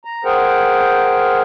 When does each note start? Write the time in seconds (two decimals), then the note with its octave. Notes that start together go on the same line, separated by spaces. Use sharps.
0.05 A#5
0.25 G#4 A#4 C5 F#5 G5